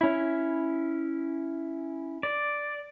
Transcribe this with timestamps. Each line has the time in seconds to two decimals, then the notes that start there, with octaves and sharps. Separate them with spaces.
0.01 C#4 E4
2.23 D5